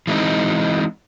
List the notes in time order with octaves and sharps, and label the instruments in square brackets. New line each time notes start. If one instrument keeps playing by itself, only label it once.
[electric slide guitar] E3 G#3 C4 D#4